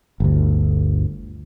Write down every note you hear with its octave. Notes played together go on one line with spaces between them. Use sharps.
G1 D2